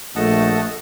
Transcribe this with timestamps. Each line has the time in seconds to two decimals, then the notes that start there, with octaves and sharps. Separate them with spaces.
0.16 A#1 A3 D#5 F#5 A5